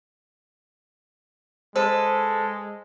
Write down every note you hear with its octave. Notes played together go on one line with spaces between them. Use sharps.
G#3 A4 B4 C5